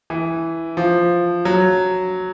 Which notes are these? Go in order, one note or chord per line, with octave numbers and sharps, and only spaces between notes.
E3
F3
F#3